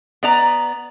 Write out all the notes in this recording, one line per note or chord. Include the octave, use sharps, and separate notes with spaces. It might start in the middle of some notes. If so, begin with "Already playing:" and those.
B3 D5 A#5